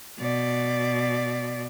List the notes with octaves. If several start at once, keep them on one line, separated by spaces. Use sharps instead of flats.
B2 D5